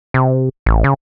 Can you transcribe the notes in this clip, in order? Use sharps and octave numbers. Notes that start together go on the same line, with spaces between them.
C3
A1
C#3